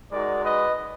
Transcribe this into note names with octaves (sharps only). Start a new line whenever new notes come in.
G#3 D#4 F#4 A#4 D5
B4 D#5